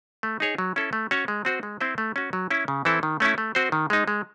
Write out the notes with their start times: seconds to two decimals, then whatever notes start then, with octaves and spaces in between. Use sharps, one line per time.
0.23 A3
0.40 D#4 G#4 C#5
0.58 F#3
0.76 C#4 E4 A4
0.93 A3
1.11 C#4 F#4 C#5
1.28 G#3
1.45 C4 F#4 C5
1.63 G#3
1.81 C4 E4 C5
1.98 A3
2.16 C#4 F#4
2.33 F#3
2.51 C#4 E4
2.68 C#3
2.85 E3 C4 E4 A4
3.03 D#3
3.20 A3 C#4 E4
3.38 A3
3.55 C4 F#4 C5
3.72 D#3
3.90 G#3 D#4
4.08 G#3